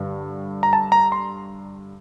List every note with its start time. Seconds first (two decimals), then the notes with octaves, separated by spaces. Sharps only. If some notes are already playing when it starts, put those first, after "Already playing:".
Already playing: G2 D3 G3
0.63 A#5
0.73 A5
0.92 A#5
1.12 C6